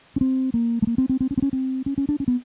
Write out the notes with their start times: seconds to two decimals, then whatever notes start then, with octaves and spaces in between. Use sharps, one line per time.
0.16 C#4
0.21 C4
0.54 A#3
0.82 A3
0.87 A#3
0.98 C4
1.09 C4
1.21 C4
1.31 C#4
1.38 C4
1.42 C#4
1.53 C4
1.86 C#4
1.98 C#4
2.09 D4
2.20 C#4
2.28 B3